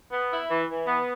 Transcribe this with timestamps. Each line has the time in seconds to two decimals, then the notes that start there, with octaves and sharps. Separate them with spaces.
0.12 B3
0.31 E4
0.50 E3
0.69 E3
0.88 B3